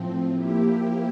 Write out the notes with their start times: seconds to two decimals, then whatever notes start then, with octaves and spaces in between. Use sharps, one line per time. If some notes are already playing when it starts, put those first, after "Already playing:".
Already playing: A2 F3 C4
0.31 F3 A#3 E4 G4